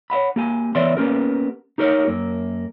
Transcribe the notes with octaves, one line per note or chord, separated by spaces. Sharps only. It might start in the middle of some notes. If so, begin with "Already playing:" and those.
C#5 E5 F#5 B5
A#3 G4 G#5
E3 B3 C#5 D5 E5 C6
A#3 B3 C#4 G4 A#4
D#4 G4 A#4 C#5
F#2 A#3